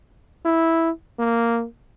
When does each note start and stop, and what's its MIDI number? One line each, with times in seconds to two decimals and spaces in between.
0.45 0.90 64
1.19 1.65 58